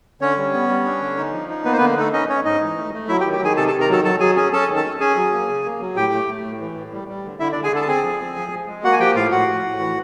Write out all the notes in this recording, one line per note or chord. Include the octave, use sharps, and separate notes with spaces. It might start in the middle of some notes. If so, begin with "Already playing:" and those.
D3 C#4 C#5
G3
B3
G3
D4
D3
D#4
F3
D#4
A#3 B3 B4
C5
D3 B3 B4
A3 D#4 A4
C#4 D#4 D#5
C#4 C#5
G#2 D#4 D#5
E3
A3
A3
F#3 E4 E5
G4 G5
D#3
G4 G5
D#3 G#4 G#5
C3 A4 A5
A4 A5
D#3
A#4 A#5
F#3 A4 A5
F#3 A4 A5
F#3 G#4 G#5
C#4 G#4 G#5
C#4 A4 A5
D#3
A4 A5
C#4
C#4 G#4 G#5
F#3
A#3
C#3
A#3
F#3
A2 G4 G5
A3
A3
A2
E3
A2
G3
G3
D3
D3 E4 E5
D4 D5
D3
G#4 G#5
D3 A4 A5
A5
C4 G#4 G#5
F3
C4
F3
F3
G#3
A#3 F#4 F#5
G#5
F3 G4 G5
A2 F4 F5
A2 F#4 F#5
A2
A2
E3